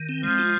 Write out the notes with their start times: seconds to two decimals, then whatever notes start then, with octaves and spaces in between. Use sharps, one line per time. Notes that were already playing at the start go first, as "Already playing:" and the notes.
Already playing: D#3
0.09 C4
0.23 F3 G#3
0.39 F4